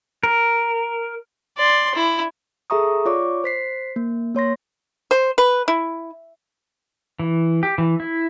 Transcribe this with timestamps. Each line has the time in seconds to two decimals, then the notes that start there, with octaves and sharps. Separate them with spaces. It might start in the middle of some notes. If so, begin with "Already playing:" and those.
0.23 A#4
1.58 D5 C6
1.95 E4
2.70 G#4 A4 E5 A#5 C#6 D#6
3.05 F4 C#5 D5 C#6 D6
3.44 C5 B6 C7
3.96 A#3
4.35 A#3 C#5 C6 A#6
5.11 C5
5.38 B4
5.68 E4
7.20 E3
7.63 G4
7.78 E3
8.00 E4